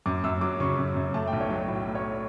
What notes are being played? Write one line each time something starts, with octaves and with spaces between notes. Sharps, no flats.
F#2 D6
F#2 E6
F#3 D6
C#3 C#6
F#2
F#2
A3 A5
G5
B1
C#5
F#3
A2
A3
C#5